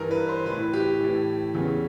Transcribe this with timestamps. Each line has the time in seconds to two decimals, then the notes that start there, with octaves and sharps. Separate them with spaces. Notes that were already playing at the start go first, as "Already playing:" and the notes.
Already playing: G2 E3 A#4
0.11 B4
0.29 C5
0.46 A2 E3 B4
0.73 G4
0.99 A2 E3
1.54 E2 C#3 E3